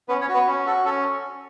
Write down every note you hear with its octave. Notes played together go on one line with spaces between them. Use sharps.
B3 C#4 B4
C#4 C#5
F#4
B3 B4
C#4
F#4 A4
C#4 A4